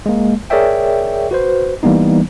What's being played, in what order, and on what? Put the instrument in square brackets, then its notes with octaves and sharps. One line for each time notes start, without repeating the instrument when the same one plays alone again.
[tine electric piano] G#3 A#3
G#4 A#4 C#5 D5 E5 G5
F#4 B4 C5
E3 G3 A#3 B3 D#4